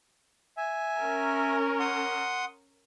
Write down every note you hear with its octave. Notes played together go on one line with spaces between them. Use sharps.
E5 G#5
C#4 A#4
F#5 C6 D#6